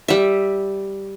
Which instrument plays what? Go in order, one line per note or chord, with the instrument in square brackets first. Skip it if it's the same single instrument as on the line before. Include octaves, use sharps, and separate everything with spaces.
[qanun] G3 E5